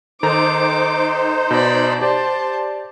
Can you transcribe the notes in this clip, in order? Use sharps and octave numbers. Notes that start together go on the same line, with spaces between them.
D#3 D#4 A4 C5 A#5 D6
B2 D5 B5
G4 C5 D5 A5